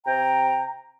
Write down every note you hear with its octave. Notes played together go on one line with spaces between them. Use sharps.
C3 G5 A#5